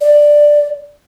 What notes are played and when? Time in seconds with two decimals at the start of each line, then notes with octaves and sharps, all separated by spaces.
0.01 D5